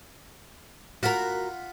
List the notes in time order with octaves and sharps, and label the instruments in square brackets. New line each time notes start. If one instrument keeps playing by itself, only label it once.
[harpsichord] F4 F#5 B5 [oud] F#4 A#4